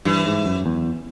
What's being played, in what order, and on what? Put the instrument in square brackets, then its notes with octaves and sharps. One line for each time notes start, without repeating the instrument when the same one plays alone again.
[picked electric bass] G2 [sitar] E3
[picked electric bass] G#2
F#2
E2